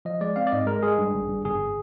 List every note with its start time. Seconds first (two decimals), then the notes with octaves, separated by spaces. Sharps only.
0.05 F3 D#5
0.21 G#3 D5
0.36 C4 F5
0.47 D5
0.52 G#2 D#5
0.67 G#3 A#4
0.83 G#3 G#4
0.98 G2
1.14 G1
1.29 G2
1.44 G1 G#4